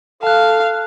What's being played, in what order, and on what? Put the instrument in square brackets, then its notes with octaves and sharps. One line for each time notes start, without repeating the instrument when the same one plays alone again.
[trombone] A4 [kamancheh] F5 [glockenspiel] A5 F#6